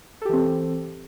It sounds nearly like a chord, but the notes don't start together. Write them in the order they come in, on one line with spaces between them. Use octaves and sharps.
A4 G4 E3 C4